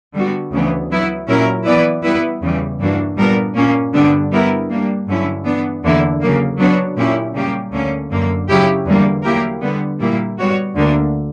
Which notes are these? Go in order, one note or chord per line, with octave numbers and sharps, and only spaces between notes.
D3 G3 B3 F#4
D2 C#3 E3 B3 D4
F#3 B3 E4
A#2 F#3 C#4 E4 A#4
E3 B3 E4 B4 D5
G3 B3 E4 B4
E2 C#3 E3 G3
G2 E3 A#3 D4 F#4
A#2 G3 B3 D4 A#4
A#2 A#3 C#4
G2 D3 G3 B3 D4
G3 B3 E4 A#4
G3 A#3 D4
G2 D3 F#3 C#4 E4
E3 B3 D4
E2 D3 A#3 E4
C#3 F#3 A#3
F#3 B3 D4 F#4 C#5
A#2 F#3 C#4 E4 G4
C#3 G3 A#3 C#4 G4
D2 D3 A#3 C#4
F#2 D3 A#3
C#3 F#3 C#4 E4 G4
E2 D3 G3 A#3
F#3 A#3 E4 G4 A#4
D3 G3 B3
A#2 G3 A#3 E4
G3 B3 F#4 C#5
D2 D3 A#3 D4